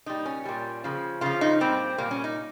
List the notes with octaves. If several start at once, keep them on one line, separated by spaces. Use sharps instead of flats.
A#2 G3 D#4
C#4
A#2 G3
C#3 F3
C#3 F3 F4
D#4
A#2 G3 C4
A#2 G3 A#3
C#4
D#4